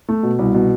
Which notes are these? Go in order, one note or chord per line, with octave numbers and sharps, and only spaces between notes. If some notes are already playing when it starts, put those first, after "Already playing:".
A3
B2
C2
B2